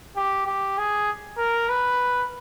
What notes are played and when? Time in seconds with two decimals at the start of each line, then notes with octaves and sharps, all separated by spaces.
0.16 G4
0.46 G4
0.78 G#4
1.38 A#4
1.69 B4